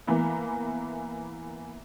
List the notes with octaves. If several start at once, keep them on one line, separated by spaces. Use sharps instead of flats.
E3 A#3 B3